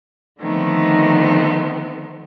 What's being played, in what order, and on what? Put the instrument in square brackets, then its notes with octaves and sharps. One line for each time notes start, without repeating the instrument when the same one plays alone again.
[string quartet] D3 D#3 F3 A3 B3 C4